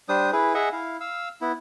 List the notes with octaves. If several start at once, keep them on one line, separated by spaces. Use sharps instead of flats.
G3 D4 C5 D#6
E4 G#4 B4
G#4 D#5 E5 F#5
E4 F5
F5 E6
B3 E4